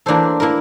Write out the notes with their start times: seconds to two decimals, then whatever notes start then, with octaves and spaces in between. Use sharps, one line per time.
0.06 E3 A#3 D4 A4 C5
0.40 A#3 E4 A#4